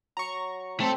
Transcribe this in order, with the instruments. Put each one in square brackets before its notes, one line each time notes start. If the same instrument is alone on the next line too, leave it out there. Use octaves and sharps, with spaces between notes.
[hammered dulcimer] F#3 [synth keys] A#5 C#6
[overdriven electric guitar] A3 A4 [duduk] C4